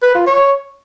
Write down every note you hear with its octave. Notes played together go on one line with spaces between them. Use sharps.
B4
F4
C#5